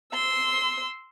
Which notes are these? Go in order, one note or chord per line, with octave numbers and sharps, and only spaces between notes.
C6 E6